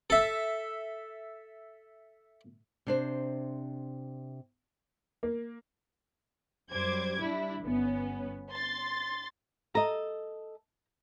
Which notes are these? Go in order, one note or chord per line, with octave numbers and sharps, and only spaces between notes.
A4 E5
C3 D4 C5
A#3
F#2 G3 C5 D6 G#6
G3 D4 E4
G1 B3 C#4
C6 A6
A4 D#5 A#5